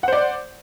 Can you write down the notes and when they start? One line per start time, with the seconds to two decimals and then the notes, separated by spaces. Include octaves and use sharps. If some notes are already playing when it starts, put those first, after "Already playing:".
0.03 F#5
0.08 C5
0.13 D5